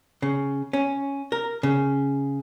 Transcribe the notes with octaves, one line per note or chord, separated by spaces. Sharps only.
C#3
C#4
A#4
C#3